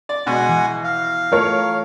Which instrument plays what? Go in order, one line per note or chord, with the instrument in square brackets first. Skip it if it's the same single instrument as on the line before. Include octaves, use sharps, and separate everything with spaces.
[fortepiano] D5
[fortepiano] B2 [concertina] G#3 F#5 G#5
[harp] E3
[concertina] F5
[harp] A3 F4 [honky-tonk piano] A#4 C#5